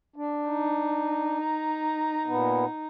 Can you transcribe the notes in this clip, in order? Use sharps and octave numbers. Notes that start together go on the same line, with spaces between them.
D4
D#4
A#5
A#2 B3